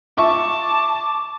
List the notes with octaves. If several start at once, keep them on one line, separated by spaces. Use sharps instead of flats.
F4 E5 A5 C#6 D6